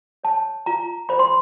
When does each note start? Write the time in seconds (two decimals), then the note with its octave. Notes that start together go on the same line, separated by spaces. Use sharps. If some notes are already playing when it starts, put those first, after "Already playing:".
0.24 C#5 A5
0.66 F4 A#5
1.09 C5 B5
1.19 C6